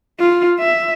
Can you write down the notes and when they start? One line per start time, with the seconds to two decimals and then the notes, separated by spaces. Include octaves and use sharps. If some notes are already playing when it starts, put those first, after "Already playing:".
0.20 F4
0.60 E5